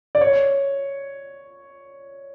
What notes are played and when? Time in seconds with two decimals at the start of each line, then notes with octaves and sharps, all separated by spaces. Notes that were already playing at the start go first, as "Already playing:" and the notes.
0.15 D5
0.21 C#5